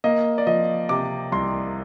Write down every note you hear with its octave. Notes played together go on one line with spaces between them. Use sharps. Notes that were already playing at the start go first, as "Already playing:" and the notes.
A#3 D#5
D5
F3 D#5
C3 D6
C2 C6